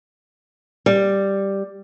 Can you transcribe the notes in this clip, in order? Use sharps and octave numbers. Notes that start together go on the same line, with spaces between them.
G3